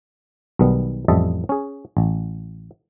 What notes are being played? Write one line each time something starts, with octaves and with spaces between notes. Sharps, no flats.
B1 D#3 G3 B3
A1 F2 G3 D#5 E5 A5
C#4 G#4
A1